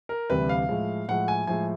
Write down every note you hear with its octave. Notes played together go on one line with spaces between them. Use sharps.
A#4
D2 C3 E3 G3 B4
F5
A2 F3 G#3
A2 F3 G#3 F#5
G#5
A2 F3 G#3 G#5